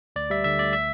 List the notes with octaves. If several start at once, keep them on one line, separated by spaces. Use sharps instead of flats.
D2 D5
G3 E5
D3 E5
D2 D5
E5